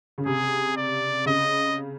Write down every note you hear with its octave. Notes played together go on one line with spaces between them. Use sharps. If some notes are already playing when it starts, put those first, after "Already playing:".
C#3
C3 G#4
D5
C#3 D#5